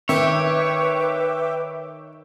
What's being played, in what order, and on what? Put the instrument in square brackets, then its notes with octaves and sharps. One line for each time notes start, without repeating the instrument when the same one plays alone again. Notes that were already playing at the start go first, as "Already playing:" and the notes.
[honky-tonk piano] D#3 [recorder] B4 [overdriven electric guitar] C#5 [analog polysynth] E5 G5 D6